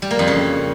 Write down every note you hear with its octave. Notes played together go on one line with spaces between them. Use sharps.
G3
A#3
F2
C#3